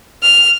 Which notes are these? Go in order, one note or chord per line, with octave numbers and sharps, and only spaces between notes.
F6